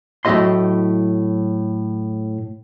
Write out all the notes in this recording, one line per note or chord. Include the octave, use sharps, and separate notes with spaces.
A2 F#3 E4 G4 D#5 C6